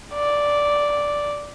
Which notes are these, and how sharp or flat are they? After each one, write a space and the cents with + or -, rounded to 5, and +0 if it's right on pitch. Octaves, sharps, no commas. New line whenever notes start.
D5 -5